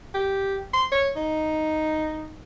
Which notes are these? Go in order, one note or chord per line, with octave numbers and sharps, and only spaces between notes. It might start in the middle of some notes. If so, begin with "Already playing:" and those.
G4
C6
C#5
D#4